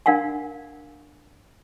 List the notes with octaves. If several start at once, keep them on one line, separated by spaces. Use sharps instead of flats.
D4 A#4 F5 F#5 G#5